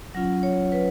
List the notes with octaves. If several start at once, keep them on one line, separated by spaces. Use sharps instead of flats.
F#3 C#4 F4 F#5
C#5
B4